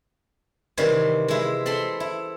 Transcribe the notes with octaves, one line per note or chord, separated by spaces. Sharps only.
C3 D#3 E3 G3 C5 C#5
G#3 E4
C4 A4 B5 C6
E4